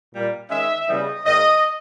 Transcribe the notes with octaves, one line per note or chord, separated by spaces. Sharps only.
A#2 G3 A#3
D#3 G#3 C#4 E5
C#3 E3 G3 B3 D#5
G#2 D#3 A#3 D#5